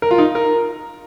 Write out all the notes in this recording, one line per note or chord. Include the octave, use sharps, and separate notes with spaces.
A#4
F4
D#4
A#4